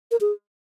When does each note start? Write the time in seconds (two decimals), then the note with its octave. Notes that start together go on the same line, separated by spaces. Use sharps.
0.11 A#4
0.21 G#4